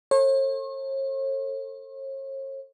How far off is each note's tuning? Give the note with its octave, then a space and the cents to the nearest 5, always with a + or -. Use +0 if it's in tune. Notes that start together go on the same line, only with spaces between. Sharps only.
A4 +30 C#5 -45